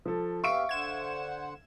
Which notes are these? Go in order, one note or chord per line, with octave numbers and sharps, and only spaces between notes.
F3 A4
B3 G4 E5 F5 C#6 D7
D3 C5 F#5 G#6 E7